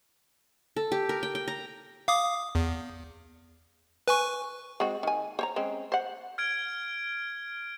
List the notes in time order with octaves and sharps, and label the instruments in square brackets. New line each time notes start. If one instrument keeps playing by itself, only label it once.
[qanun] A4
G4
A#4
G5
G5
A#5
[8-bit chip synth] F5 D6 D#6
E2
B4 G#5 C#6
[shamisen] G#3 C4 F#4
D#3 G#5
C5 C#5 A#5
G#3 C4 C#4
C5 F#5
[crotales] F6 G#6 D7